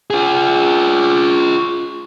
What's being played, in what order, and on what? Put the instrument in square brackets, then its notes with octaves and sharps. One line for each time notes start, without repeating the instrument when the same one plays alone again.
[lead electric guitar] F4 G#4